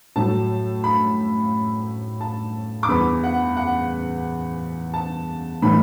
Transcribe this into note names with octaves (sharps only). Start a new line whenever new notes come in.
A2 F#3 A3 A5
B5
A5
D6
E2 E3 B3 B5
F#5
F#5
A5
A2 E3 A3 B5